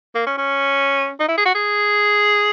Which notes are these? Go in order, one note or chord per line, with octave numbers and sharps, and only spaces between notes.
A#3
C#4
C#4
D#4
E4
G#4
F#4
G#4